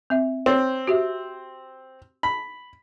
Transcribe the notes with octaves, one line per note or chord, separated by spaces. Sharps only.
C4 E5
C4 C#5
F#4 G4 E5
B5